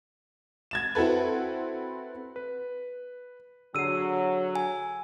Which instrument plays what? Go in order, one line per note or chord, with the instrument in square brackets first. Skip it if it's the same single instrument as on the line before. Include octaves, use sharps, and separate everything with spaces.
[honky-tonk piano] G#6 A6 E7
C4 E4 F#4 A4 B4
[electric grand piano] B4
[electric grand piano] D3 G#4 C7 [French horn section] F#3 [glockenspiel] E6 D#7
[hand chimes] G#5